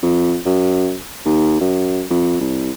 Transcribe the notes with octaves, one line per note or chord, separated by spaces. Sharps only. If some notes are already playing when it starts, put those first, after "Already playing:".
F2
F#2
D#2
F#2
F2
C2